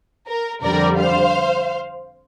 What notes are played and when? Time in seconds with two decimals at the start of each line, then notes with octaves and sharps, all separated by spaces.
0.28 A#4
0.63 F2 D3 G3 A#4 D5
0.99 C5 F5